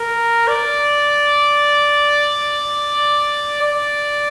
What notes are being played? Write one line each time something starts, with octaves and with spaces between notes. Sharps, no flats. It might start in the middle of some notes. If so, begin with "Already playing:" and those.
Already playing: A#4
D5
D5